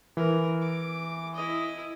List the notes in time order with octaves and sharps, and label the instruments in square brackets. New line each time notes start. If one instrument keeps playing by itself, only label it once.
[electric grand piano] E3 [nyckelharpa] A#4
[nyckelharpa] D6
E4 D#5